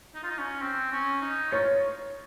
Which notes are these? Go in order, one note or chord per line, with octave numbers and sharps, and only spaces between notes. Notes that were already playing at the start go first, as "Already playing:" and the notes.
D#4
F4
D#4
C#4
C4
C#4
D#4
F4 C#5